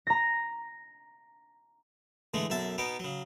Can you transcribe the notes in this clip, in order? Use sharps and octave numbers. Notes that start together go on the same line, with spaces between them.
A#5 A#6
D3 E3 G#3 A3
B1 F#2 E5 A5
B2 B3 D#4 D6
C#3 F#3